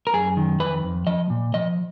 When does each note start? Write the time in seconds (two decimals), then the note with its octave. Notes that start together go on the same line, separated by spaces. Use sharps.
0.07 A#4
0.13 F#2 G#4
0.37 D#3
0.60 F2 B4
0.83 F2
1.07 F3 D#5
1.30 A#2
1.54 F3 D#5